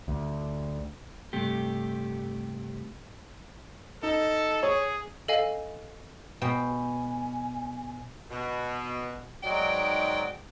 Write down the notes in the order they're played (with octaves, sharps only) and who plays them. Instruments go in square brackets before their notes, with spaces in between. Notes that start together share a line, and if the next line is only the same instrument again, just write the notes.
[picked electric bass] D2
[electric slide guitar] G2 C3 A3 G4
[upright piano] D#4 [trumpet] A4
[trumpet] G#4 [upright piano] C#5
[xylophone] A4 D#5 F5 G#5
[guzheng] B2 G5 [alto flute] G#5
[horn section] B2
G#2 F#3 D#4 D5 G5